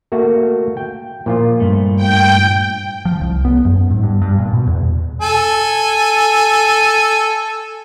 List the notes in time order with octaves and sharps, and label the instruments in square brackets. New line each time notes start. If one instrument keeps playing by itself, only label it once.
[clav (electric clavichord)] A3 A#3 F#4
G5
A#2 F3 F4
[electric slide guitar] G2 A3
[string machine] G5
[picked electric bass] F3
C2
B3
F#2
G#2
G2
G2
A#2
B2
E2
[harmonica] A4 G#5